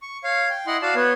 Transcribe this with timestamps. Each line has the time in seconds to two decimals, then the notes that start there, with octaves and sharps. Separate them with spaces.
0.02 C#6
0.24 C#5 F5
0.50 G5
0.67 E4 D#5 F#5 C6
0.82 F#4 D5 F5 A5
0.96 B3 B4 C#5